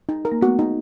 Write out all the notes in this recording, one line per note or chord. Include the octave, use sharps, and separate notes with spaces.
D#4
A#4
A#3
A3 B3 F#4
D#4